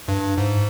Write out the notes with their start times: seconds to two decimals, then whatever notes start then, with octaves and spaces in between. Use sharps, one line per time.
0.08 G2
0.37 G#2